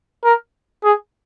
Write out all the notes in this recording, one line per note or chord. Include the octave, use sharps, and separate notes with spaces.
A#4
G#4